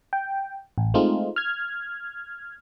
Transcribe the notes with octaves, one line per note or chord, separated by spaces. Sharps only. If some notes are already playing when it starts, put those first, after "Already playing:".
G5
A1
G#3 A3 C4 D#4 F4
F6 G#6